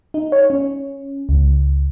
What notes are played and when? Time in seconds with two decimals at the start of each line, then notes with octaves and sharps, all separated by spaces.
0.14 D#4
0.32 C#5
0.50 C#4
1.29 C#2